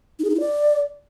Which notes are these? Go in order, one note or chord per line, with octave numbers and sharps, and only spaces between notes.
D#4
G#4
D#4
E4
D5